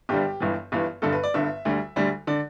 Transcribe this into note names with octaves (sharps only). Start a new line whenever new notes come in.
G1 G2 D3 G3 G4
G1 G2 E3
G1 G2 E3
G1 G2 D3 A4
B4
D5
G1 G2 D3 E5
D2 D3 G3
D2 D3 G3
D3 D5